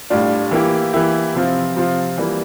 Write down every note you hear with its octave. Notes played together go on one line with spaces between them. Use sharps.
A2 G3 D4 F4
E3 A#3 E4 G4
E3 A#3 E4 G4
C3 F3 C4 F4
C3 F3 C4 F4
E3 G3 A#3